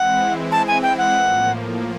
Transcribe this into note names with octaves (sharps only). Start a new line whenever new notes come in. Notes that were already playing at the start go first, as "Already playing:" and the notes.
Already playing: E3 G#3 C4 E4 F#5
A5
G#5
G5
F#5
A2 F3 A#3